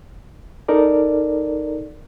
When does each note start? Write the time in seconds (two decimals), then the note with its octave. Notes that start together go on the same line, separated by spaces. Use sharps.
0.68 D#4 A4 A#4 D5